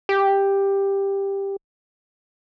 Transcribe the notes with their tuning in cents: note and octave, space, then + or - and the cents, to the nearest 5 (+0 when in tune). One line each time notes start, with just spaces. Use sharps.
G4 +10